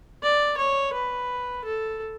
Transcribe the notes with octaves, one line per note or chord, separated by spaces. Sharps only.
D5
C#5
B4
A4